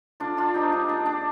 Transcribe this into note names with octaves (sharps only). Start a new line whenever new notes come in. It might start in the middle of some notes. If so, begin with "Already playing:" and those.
D3 D4 F4
D4 F4
F3 G#3 D#4 G4
D#4 G4
A#2 D4
D4